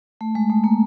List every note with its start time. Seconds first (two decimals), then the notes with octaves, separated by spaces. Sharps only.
0.21 A3
0.35 G#3
0.50 A3
0.64 A#3